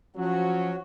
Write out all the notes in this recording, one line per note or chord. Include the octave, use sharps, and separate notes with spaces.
F3 F#3 C#4 F#4